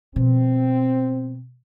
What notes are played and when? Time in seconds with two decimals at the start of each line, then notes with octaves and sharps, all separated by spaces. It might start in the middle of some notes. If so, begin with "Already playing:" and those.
0.16 B2 F3 C4